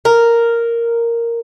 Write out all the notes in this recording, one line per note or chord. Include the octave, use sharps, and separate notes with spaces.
A#4